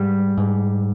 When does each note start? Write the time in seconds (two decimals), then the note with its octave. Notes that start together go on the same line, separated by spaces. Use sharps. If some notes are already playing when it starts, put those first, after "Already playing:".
Already playing: G#2 G3
0.38 G#2